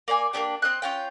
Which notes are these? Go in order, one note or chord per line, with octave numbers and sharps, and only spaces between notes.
A#3 D5 E5 G#5
A#3 B3 D4 G4
C4 D#5 F#6
C#4 F4 G5